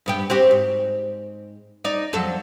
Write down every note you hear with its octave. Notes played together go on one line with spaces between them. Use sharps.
G2 B3 G4
C4 F#4 G4
G#2
D#4 D5
F2 F#3 A4